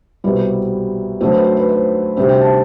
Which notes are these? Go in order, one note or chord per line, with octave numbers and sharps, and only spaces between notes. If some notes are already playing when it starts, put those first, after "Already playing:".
C2 B2 G3 C4 B4
D2 D3 F#3 A3 C4 C5
B4
C5
B4
C5
D2 C3 G3 C4 C5
G5
A5